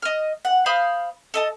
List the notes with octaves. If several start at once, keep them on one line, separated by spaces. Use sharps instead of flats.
D#5 F6
F#5
C5 F5 B5 D#6
A4 D#5 A5